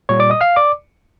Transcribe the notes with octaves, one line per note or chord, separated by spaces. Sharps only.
A#2 G3 C#5 C#6
D5 D6
D#5 D#6
F5 F6
D5 D6